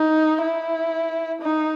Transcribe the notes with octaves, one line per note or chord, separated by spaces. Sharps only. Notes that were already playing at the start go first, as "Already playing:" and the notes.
Already playing: D#4
E4
D#4